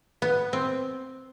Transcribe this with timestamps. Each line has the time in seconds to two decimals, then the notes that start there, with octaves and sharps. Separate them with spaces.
0.22 B3
0.53 C4